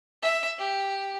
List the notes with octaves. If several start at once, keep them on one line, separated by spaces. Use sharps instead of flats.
E5
G4